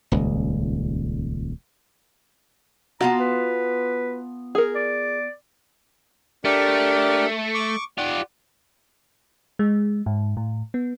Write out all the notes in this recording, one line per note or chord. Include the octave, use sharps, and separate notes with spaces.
D#1 C#2
B3 F4 F#4 A5 A#5
B4
G#4 A#4
D5
A3 D4 G4 A#4
C#6 D6
F4 G4 D5 F#5
G#3
G#2
A2
B3